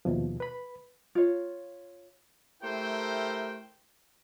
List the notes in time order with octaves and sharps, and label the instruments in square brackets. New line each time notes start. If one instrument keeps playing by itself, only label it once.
[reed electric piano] D#2 B2 F3
B4 B5
[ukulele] F4 C#5
[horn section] A3 E4 G4 A#4 C5 G5